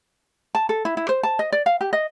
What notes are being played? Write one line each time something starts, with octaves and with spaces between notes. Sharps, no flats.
A5
A4
E4
E4
C5
A5
D#5
D5
F5
G4
D#5